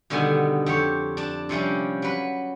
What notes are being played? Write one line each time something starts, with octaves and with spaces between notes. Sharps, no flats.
B2 D3 D#3 G3 B3 G#5
F2 G4 C#5
D4 A5
C3 F3 G3 C#4
F#3 B4